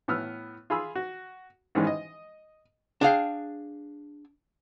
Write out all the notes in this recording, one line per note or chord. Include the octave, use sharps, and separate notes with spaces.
A2 B3 E6 F6
F4 G#4 B5 E6
F#4
G#2 D#3 E3 G3 G#3 C#4
D#5
D4 G#4 F5 G5